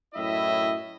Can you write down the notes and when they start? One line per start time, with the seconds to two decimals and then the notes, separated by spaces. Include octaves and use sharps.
0.14 F#2 A2 E4 D#5 E5